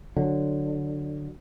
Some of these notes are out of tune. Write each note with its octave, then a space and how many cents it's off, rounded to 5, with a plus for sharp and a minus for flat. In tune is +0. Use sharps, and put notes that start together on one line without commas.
D3 +10 F#3 +0